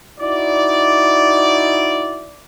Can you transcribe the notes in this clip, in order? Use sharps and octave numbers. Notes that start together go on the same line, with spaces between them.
D#4 E4 F#4 D5